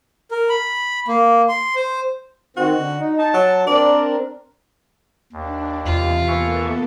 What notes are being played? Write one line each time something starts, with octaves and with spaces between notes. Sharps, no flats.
A#4
B5
A#3
C6
C5
D#3 C4 F#4
D3
D#4
D#4 A5
F#3
C4 D4 A#4 D5
D#2 D4
E2 C3 E3 F4
E3 A#3 B3 A4 E5 C#6